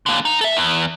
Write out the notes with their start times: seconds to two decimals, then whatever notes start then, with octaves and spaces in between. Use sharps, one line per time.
0.06 D3 A#3
0.25 D#4
0.41 A4 E5
0.57 E2